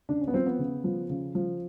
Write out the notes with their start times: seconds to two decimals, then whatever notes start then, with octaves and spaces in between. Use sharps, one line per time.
0.09 C#3 D4
0.21 C#4
0.28 B3
0.34 F3 C4
0.46 B3
0.59 C#3
0.84 F3
1.10 C#3
1.35 F3